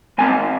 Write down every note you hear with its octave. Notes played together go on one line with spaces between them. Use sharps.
G#2 G#3 C4 G#5